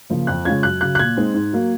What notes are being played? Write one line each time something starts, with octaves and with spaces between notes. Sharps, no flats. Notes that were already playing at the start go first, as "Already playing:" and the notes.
C#3 F3 A#3
F2 F#6
C#3 G#3 C#4 F4 G#6
F#2 F#6
C#3 F#3 F#6
F#6
A#2 G#6
G#3 C4 D#4
G#2
F#3 A#3